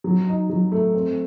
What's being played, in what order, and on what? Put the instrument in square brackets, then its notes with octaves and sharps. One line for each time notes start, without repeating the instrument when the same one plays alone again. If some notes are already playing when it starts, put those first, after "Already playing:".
[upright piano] F#3
D#4
F#3
A3
C4